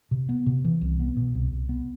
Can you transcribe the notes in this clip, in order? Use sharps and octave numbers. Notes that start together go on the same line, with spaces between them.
C3
B3
C3
E3
C2
B3
B2
C2
C2
B3